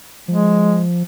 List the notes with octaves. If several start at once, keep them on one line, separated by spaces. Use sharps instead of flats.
F3 G#3